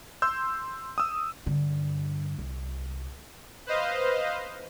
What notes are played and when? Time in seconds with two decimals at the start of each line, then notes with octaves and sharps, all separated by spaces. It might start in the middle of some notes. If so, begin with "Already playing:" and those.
0.22 C6 E6 G6
0.98 D#6 E6
1.46 G2 D3
2.38 C2
3.67 B4 C5 D#5 F5